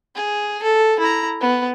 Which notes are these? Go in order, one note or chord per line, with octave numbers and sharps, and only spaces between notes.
G#4
A4
E4 A#5
B3